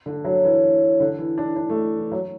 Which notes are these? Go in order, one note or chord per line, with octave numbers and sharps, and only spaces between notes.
D3
F#3
E3
D3
E3
D4
D4
A3
E3
F#3